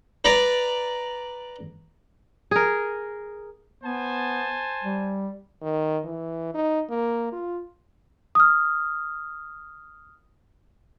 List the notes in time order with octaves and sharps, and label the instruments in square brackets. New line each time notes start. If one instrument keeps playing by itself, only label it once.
[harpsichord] B4 D5 A#5
[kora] G#4 A#4
[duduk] B3 [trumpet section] C5 G#5 A5
[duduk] G3
[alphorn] D#3
E3
D#4
A#3
F4
[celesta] D#6 F6